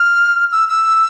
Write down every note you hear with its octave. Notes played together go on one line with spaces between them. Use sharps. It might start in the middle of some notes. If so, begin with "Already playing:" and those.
Already playing: F6
E6
E6